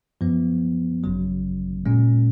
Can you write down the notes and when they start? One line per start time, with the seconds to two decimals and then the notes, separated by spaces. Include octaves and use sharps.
0.21 F#2 F3 B3
1.04 G#1 F#2 C#3 F#3
1.86 A#2 G#3 C#4